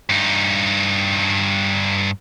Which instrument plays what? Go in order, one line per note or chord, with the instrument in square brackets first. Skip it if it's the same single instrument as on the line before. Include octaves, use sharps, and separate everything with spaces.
[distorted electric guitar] G2 D#4